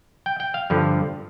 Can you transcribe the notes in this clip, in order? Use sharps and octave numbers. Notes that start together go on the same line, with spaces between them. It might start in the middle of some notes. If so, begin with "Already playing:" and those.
G5
G5
F5
G2 D3 F3